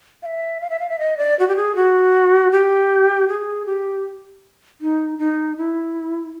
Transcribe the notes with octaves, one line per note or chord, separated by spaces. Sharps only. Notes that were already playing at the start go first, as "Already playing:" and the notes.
F5
E5
F5
E5
F5
E5
D#5
D5
F#4
G4
G#4
F#4
G4
G#4
G4
D#4
D#4
E4